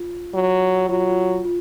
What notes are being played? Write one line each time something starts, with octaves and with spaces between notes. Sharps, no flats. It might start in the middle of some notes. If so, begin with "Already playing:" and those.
Already playing: F4
F#3
F#3 F4
F4
F4